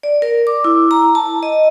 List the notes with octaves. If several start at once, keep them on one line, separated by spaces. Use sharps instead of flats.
D5
A#4
D6
E4
A#5
A5
D#5